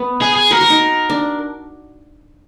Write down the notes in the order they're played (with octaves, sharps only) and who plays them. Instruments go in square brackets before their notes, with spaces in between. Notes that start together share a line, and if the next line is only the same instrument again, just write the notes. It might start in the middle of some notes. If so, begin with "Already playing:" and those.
Already playing: [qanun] B3
[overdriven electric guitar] G#4
G#4
[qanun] F#4 [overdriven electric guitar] A#4
[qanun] F#4
D#4
D4